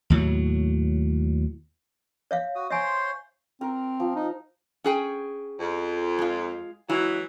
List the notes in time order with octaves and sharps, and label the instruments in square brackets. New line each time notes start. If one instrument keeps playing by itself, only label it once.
[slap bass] D#2 A2 F#3
[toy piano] C#5 E5 F5
[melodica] F#4 D#6
[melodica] C5 C#5 C6 [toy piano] E5 G#5
[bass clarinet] C4 [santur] A#4
[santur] F3
[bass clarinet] D#4
[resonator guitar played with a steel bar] C#4 G#4 G5
[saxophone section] F2
[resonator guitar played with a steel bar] G#3 F4
[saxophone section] E3 F#3 [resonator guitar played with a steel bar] G#3 E4